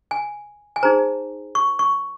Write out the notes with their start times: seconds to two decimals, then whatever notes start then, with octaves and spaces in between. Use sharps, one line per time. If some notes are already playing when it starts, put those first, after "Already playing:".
0.11 G#5
0.76 G#5
0.83 D#4 G#4 C5 A#5
1.55 C#6
1.79 C#6